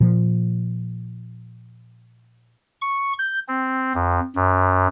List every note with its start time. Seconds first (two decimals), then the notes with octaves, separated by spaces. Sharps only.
0.01 A#2 F3
2.82 C#6
3.18 G6
3.48 C4
3.94 F2
4.36 F#2